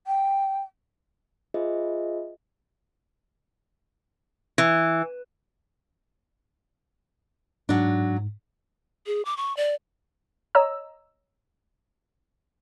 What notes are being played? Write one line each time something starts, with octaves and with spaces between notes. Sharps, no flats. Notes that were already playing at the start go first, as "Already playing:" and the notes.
G5
F4 G#4 C5 D#5 E5
E3
G#2 F#3 D4
G#4
D6
C#6
D5
C#5 D#5 A#5 E6